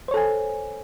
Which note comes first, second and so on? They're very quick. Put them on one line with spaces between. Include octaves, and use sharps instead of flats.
C5 C#5 A4 G#5